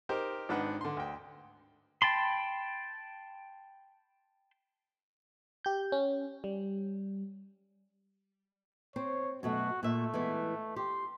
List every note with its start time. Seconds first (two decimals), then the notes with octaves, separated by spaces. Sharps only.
0.09 D#4 G4 A#4 C5
0.49 G#1 D#3 D4 B4 F#5 F#6
0.81 D3 C6
0.97 D2 G5
2.02 G5 A5 B5 C6
5.65 G4 G6
5.92 C#4
6.44 G3
8.96 C4 C5 C#5
9.43 F#2 B2 A3 F#4
9.83 A#2 A3 E5
10.14 E3 G#3 B3
10.76 G4 C6